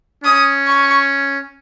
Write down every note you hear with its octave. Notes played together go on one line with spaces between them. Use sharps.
C#4 D#6
C#6